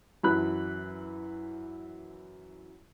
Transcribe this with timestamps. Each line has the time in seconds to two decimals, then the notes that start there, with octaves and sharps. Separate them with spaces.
0.23 F#2 E3 B5 F#6